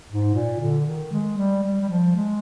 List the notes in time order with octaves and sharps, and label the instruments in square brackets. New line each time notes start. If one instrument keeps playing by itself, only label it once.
[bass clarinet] G#2
A#2
D3
D#3
G#3
G3
G3
G3
F3
G#3